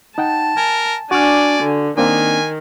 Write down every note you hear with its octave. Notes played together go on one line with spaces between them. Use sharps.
D#4 F#5 G5 A5
A#4 G#5
D4 F#4 D5 G#5 C#6 F6
D3
D#3 A#3 C4 D4 G#5